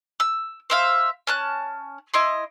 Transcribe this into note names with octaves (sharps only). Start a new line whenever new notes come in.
E6
C5 E5 F5
C#4 A5 F#6
E4 D#5 C6